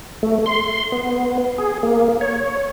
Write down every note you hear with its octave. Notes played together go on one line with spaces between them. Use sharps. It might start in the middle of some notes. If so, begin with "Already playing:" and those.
A3
C6
B3
G#4
A#3
C#5